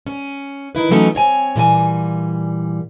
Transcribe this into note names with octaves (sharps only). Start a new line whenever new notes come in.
C#4
D#3 E4 B4
E3 F#3 A3 C#4 D#4
C4 C#5 G#5
A#2 E3 G3 G#5